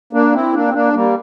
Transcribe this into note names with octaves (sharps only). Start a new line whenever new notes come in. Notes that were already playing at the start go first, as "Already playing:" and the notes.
A#3 D4
C4 E4
A#3 D4
C4
A#3 D4
G3 A#3